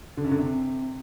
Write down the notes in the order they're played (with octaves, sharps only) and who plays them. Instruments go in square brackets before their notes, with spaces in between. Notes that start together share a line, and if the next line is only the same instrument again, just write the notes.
[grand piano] D3
F#2
D3
C3